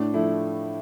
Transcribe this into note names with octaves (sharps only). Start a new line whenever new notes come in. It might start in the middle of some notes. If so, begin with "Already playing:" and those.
Already playing: A2 D4
F3 A3 E4